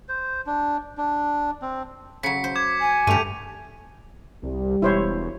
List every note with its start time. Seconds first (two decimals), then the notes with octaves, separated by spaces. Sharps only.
0.09 C5
0.47 D4
0.98 D4
1.62 C4
2.23 C#3 F#3 B6 C#7
2.44 C5
2.55 D6 G#6
2.81 G#5
3.07 G2 A3 G4 D#7 F7
4.43 C2 G3
4.82 E1 E4 C5 C#5